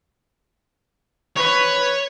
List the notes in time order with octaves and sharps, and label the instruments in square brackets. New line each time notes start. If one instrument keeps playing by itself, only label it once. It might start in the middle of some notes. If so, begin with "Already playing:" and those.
[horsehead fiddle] B4 [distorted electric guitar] C#5